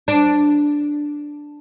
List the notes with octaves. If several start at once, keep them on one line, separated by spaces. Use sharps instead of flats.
D4